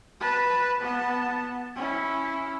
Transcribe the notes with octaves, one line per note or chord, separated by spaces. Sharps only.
B4 A5
B3 A5
C#4 E4